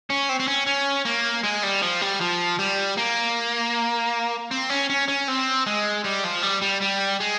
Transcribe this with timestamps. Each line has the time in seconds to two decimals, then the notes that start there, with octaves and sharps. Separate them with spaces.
0.10 C#4
0.29 C4
0.40 C4
0.48 C#4
0.67 C#4
1.06 A#3
1.44 G#3
1.63 G3
1.82 F3
2.02 G3
2.20 F3
2.59 G3
2.97 A#3
4.51 C4
4.70 C#4
4.90 C#4
5.08 C#4
5.28 C4
5.66 G#3
6.05 G3
6.24 F3
6.43 G3
6.62 G3
6.82 G3
7.20 G#3